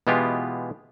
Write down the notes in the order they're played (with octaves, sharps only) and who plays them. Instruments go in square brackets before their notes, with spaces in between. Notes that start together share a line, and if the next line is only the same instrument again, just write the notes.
[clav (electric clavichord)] B2 E3 G#3 B3 F4 G4